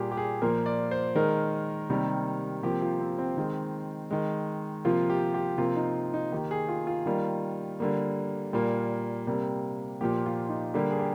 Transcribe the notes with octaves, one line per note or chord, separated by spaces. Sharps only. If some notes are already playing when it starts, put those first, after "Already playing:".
Already playing: A#2 G3 A#3 G4 G#4
G4
G#4
A#2 F3 A#3 A#4
D5
C5
D#3 G#3 A#4
C3 D#3 G3 A#3
C3 F3 A#3 G4
F4
C4
C4
D#3 G#3
D#3 G#3
C3 F3 A#3 F4
G4
G4
C3 F3 A#3 F4
D#4
D#4
D#3 A#3 G4
G#4
F4
F4
D#3 G3 A#3
D3 G3 A#3
A#2 G3 A#3
C3 G3 A#3
A#2 F3 A#3 G4
F4
D#4
D3 G3 A#3 G4
G#4
G4